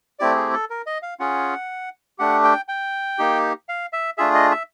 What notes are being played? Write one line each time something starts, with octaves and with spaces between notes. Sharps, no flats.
A3 C4 E4 G4 D5
G#4
A4
A#4
D#5
F5
C#4 F4 G#4 F#5
A3 D4 G4 F#5
G5
G5
A#3 D#4 G4
F5
E5
A3 D4 F4 G#4 E5
D#5
E5